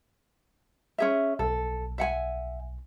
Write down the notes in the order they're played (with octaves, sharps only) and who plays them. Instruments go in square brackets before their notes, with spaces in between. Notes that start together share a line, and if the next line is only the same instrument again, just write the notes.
[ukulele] C#4 G#4 E5
[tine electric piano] B1 [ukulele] A4
[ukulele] E5 F#5 G#5